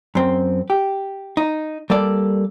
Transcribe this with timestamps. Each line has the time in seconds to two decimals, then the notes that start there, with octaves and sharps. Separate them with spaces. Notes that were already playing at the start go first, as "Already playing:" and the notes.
0.15 F#2 C4
0.70 G4
1.37 D#4
1.90 G3 A#3 A4 D5